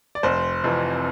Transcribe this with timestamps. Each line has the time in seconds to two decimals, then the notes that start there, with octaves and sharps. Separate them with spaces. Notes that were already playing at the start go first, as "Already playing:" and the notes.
0.15 D5
0.23 F1 C5
0.64 F2 C3 E3